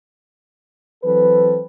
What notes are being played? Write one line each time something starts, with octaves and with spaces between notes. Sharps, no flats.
E3 F#3 C4 A4 B4